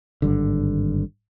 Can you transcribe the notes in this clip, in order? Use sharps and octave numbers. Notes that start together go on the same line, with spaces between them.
G#1 G2 D3